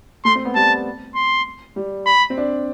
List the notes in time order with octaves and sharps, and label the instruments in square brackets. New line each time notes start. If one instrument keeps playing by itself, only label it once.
[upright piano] A3 [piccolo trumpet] C6
[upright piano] C4
B3
[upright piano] G3 [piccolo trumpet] A5
[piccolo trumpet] C6
[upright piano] G3
[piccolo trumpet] B5
[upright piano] C4
D4